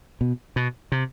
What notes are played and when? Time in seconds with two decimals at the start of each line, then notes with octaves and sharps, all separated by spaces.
0.21 B2
0.56 B2
0.92 C3